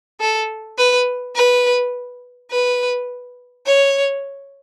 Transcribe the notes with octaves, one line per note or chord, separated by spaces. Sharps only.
A4
B4
B4
B4
C#5